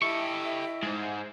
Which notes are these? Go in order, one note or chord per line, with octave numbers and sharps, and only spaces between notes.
E4 G4 A4 D#5 E5 C#6
G#2 G#3 C5